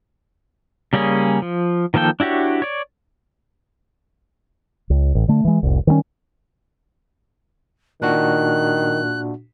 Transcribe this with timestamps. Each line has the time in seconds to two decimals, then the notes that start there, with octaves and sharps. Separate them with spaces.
0.93 C#3 G3 A#3 C#4 G#4
1.42 F3
1.94 D#3 F3 A#3 A4 G5
2.20 D4 E4 F#4 G4 C#5
2.62 C#5 D5
4.90 C#2
5.15 A1
5.28 D3 A3
5.45 E3 G#3
5.63 F1 C2
5.87 D#3 G3 C4 C#4
8.02 A#2 D#3 D4 F#4 F#6